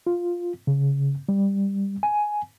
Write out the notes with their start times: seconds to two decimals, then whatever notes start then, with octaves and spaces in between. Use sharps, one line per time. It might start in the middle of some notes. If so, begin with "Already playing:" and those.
0.07 F4
0.67 C#3
1.29 G3
2.03 G#5